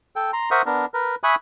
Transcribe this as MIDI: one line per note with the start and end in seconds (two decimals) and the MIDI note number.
0.16 0.31 69
0.16 0.31 79
0.33 0.50 82
0.33 0.50 84
0.51 0.62 70
0.51 0.62 72
0.51 0.62 76
0.51 0.62 78
0.51 0.62 85
0.51 0.62 87
0.66 0.85 59
0.66 0.85 62
0.66 0.85 70
0.94 1.15 70
0.94 1.15 71
1.24 1.35 76
1.24 1.35 80
1.24 1.35 83
1.24 1.35 85
1.24 1.35 87
1.24 1.35 90